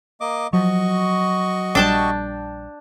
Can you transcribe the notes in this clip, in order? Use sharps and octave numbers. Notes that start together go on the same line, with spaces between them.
A#3 D#5 D6
F3 F#3 F#4 D#5 C#6
A#1 G3 D4 G5 A5